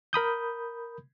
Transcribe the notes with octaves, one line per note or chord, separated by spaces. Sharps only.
A#4 B5 D#6 G6